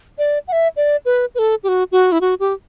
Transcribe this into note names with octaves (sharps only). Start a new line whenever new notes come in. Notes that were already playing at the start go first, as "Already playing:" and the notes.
D5
F#5
E5
D5
B4
B4
A4
G4
F#4
F#4
E4
F#4
G4